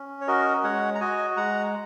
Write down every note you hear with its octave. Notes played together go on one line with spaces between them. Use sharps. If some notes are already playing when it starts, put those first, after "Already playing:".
Already playing: C#4
C#5
F#4 A#4 D#5
G#3 C#5 F#5
A#5
F#4 D#5 G#5
G#3 F#5 A#5